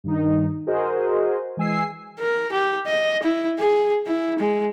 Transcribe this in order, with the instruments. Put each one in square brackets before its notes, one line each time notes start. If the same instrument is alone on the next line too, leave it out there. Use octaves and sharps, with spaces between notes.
[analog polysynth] G2 D#3 D#4
F#4 G#4 A#4 C5 D#5
E3 G#3 G#5 E6 C7
[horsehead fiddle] A#4
G4
D#5
E4
G#4
E4
G#3